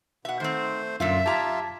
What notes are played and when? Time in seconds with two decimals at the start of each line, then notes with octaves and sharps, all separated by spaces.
0.25 B2 E5 F#5
0.40 D#3 A3 C4 C5
1.00 F#2 A#2 D3 F4 E5
1.26 F4 G4 A5 A#5 G#6 B6